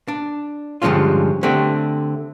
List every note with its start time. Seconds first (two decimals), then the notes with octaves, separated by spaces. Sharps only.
0.08 D4
0.82 G2 D3 F3 G#3 C#4 F4
1.43 D3 A3 C4 G4